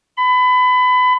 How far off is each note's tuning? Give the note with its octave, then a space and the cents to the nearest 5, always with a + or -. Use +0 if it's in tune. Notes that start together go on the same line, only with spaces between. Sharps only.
B5 +25